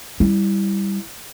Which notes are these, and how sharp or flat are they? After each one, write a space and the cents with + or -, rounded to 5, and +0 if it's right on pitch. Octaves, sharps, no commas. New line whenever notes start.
G3 +0 E4 +0